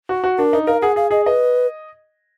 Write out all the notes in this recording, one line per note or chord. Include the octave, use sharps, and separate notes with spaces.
F#4
F#4
D4 A#4
D#4
A#4 F5
G#4 F#5
G#4 F5
G#4 D#5
B4 D#5